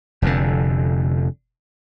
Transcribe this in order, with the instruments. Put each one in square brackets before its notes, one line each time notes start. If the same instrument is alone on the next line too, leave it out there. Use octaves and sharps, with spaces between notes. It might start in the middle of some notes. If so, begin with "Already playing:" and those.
[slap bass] F1 F2 A#2 D3